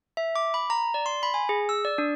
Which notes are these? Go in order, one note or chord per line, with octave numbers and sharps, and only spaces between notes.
E5
D6
B5
A#5
D5
C6
B5
G#5
G#4
E6
D5
D4